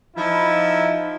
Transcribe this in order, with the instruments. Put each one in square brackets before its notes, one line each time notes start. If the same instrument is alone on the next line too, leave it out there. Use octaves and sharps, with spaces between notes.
[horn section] F3 D#4 E4